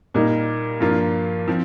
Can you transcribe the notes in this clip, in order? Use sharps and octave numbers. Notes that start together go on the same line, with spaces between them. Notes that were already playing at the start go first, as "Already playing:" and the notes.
A#2 G3 A#3 D#4
G2 F3 A#3 F4
F3 C4